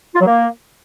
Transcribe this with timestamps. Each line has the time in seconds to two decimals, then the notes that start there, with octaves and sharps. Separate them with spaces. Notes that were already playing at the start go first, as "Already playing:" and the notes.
0.15 F4
0.21 F#3
0.26 A#3